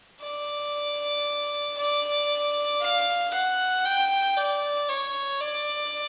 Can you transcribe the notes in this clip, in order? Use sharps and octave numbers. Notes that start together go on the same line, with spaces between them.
D5
D5
F5
F#5
G5
D5
C#5
D5